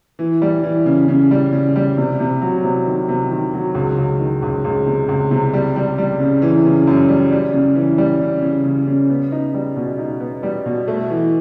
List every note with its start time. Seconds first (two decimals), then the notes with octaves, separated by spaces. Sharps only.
0.19 E3
0.42 G3
0.63 E3
0.86 C#3
1.08 C#3
1.31 G3
1.53 C#3
1.76 G3
1.97 C3
2.20 C3
2.41 F#3
2.63 C3
2.86 D#3
3.09 C3
3.31 D#3
3.53 F#3
3.75 C#2
3.98 C#2
4.20 D#3
4.42 C#2
4.65 C#2
4.86 C3
5.09 C#2
5.31 C3
5.54 G3
5.76 G3
5.98 G3
6.20 C#3
6.42 E3
6.65 C#3
6.87 F#2
7.09 G3
7.32 G3
7.53 C#3
7.76 E3
7.98 G3
8.21 C#3
8.42 C#3
8.65 C#3
8.87 C#3
9.10 B3
9.32 D#4
9.54 G3
9.76 B2
9.98 D#4
10.20 B3
10.43 G3
10.66 B2
10.88 A3
11.10 E3